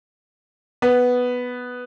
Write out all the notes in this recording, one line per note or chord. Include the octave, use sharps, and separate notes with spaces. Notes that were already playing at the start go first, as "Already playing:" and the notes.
B3